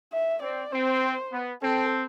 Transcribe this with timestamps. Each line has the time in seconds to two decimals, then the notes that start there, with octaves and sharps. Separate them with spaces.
0.13 E5
0.42 C4 D5
0.72 C4 C5
1.32 B3
1.62 C4 A4